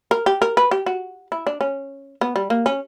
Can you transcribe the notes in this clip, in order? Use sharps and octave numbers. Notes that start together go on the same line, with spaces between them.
A#4
G4
A#4
B4
G4
F#4
E4
D4
C#4
B3
G3
A#3
C#4